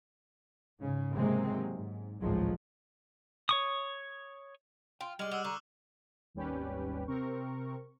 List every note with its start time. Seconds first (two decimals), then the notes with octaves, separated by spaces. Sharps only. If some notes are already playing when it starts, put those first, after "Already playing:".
0.79 G#2 C#3
1.15 C3 D#3 F#3 G#3 A#3 C4
1.74 G#2
2.21 G#1 C#2 A2 F3 F#3 G#3
3.49 C#5 C#6 D#6
5.01 F4 G5
5.19 G3 G#3 G4 F6 F#7
5.31 G#3 F#5 D6 E6 F#6
5.44 D3 A#5 C#6 D6
6.34 G#1 D#2 G3 C#4 G4 B4
7.08 C3 C4 A#4 C#6